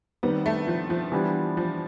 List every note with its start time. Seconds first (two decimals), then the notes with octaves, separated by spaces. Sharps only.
0.23 D#3 G3 B3 C4
0.46 A3
0.67 F3
0.90 F3
1.12 E3 G3 B3 D4 G4
1.57 F3